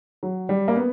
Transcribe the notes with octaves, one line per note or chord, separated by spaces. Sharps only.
F#3
G3
A#3
B3